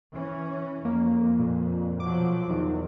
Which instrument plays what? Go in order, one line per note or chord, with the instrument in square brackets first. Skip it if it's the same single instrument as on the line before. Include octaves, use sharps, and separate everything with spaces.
[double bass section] E3 C#4
[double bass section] F2 [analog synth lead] A#3
[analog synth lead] A#2
[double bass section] B2 F3 F#3 [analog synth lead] D6
[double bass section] E2 [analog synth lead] D#3